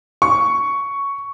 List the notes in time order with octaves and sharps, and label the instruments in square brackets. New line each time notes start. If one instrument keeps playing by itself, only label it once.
[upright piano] C#6